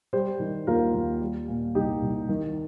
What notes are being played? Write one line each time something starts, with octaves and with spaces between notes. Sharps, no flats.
G3 G4 C5
D#3
D#2 F4 A#4
D#2
G3
A#2
C2 D#4 G4
C2
D#3